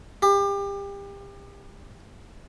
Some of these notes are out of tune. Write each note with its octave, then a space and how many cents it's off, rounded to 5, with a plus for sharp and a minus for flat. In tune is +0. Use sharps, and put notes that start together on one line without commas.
G4 +30